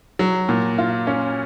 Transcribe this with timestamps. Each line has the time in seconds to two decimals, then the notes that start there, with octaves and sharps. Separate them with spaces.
0.19 F#3
0.49 A#2
0.78 F4
1.07 C#4